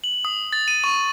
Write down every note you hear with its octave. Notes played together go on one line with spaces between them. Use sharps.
F#7
D#6
A6
D#7
C#6